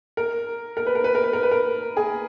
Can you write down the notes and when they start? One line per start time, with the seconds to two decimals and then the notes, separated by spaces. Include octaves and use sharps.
0.17 A#4
0.77 A#4
0.87 B4
0.95 A#4
1.04 B4
1.15 A#4
1.24 B4
1.33 A#4
1.43 B4
1.51 A#4
1.97 G#4